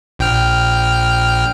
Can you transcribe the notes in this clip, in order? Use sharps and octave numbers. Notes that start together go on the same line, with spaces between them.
A#1 G5 F6